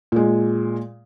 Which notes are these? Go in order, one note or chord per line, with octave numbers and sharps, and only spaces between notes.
A#2 G#3